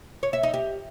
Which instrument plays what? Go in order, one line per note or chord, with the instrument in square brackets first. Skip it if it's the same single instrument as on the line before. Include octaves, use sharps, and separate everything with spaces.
[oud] C#5
E5
D#4
G4